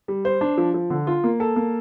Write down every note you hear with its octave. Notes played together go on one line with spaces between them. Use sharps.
G3
C5
D4
F3
F3
D3
F4
A#3
A4
A#3